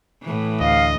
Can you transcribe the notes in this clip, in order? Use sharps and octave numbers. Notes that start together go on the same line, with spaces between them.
A2 E3
D2 D#5 F5